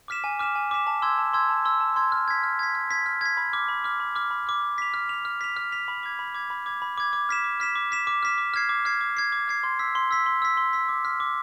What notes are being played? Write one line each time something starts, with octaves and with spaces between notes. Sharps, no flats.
D6 F6 B6 E7
G#5
D6 F6 B6 E7
G#5
D6 F6 B6 E7
A5
C6 E6 G#6
A5
C6 E6 G#6
A5
C6 E6 G#6
A5
C6 E6 G#6
F6
G#6 B6
F6
G#6 B6
F6
G#6 B6
F6
G#6 B6
B5
D6 F6
B5
D6 F6
B5
D6 F6
B5
D6 F6
F6
B6 F7
F6
B6 F7
F6
B6 F7
F6
B6 F7
B5
D6 G#6
B5
D6 G#6
B5
D6 G#6
B5
D6 G#6
D6
F6 B6 E7
D6
F6 B6 E7
D6
F6 B6 E7
D6
F6 B6 E7
D6
F6 G#6 C7
D6
F6 G#6 C7
D6
F6 G#6 C7
D6
F6 G#6 C7
C6
E6 B6
C6
E6 B6
C6
E6 B6
C6
E6 B6
D6
F6 B6
D6